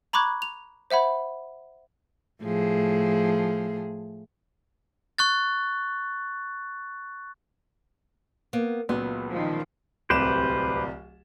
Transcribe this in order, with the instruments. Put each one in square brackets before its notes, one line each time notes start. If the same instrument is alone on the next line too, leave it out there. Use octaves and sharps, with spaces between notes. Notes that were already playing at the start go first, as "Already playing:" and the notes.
[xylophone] A#5 B5 C#6 D6 F#6 G#6
F7
C5 E5 F#5 B5
[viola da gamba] A2 F3 G#4
[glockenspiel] C#6 F#6 A6
[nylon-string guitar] A#3 B3
[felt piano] C#2 A#2 F#3 [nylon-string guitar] B3
[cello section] D#3 F3
[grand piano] D1 C2 E7 [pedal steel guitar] G4 B4 C5